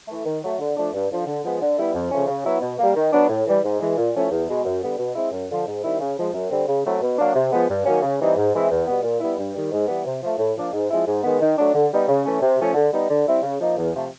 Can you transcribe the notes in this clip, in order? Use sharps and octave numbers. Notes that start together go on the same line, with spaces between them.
E3 A3
D#3
F#3 A3
D3
F3 A3 D4
G2
D3 F3
D3
F3 G#3 B3
D3
G3 B3 E4
F2
C#3 F3 A3 C#4
C#3
F#3 B3 E4
B2
G3 A#3
D#3
F#3 B3 D4
A2
E3 G3
G#2
E3 G#3
A#2
F3 A3 C#4 E4
E2
B2 G#3
F#2
D3 G3 B3
B2
G#3 C4 E4
F#2
D3 F3
G#2
D#3 G3 C4 E4
C#3
F3 G#3
F#2
D3 G3 C4
C#3
F#3 A3 C4 E4
B2
F#3 A#3 D4
C3
F3 G#3 B3
G2
D#3 F#3 A#3 C#4
C#3
E3 G3 C4 D#4
G#2
E3 G#3 C4 E4
E2
B2 G3 B3
A#2
G3 B3 E4
G2
D#3 G3
G#2
E3 G3 B3
C3
F3 A3
A2
F3 A#3 D4
G#2
F3 G#3 C4 E4
G#2
D#3 G#3 B3
D#3
F#3 A3 D4
D3
G3 B3 D#4
C#3
E3 A3 C#4
C3
F3 A3 C#4
D3
G3 B3 D#4
D3
G3 C4 E4
C#3
F3 A#3 D#4
E2
C3 F3 A3